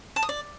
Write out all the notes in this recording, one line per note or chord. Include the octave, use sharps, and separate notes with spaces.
A5
D#6
D5